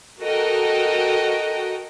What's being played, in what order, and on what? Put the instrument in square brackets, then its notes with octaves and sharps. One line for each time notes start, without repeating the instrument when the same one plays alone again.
[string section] F#4 A4 A#4 D#5 G5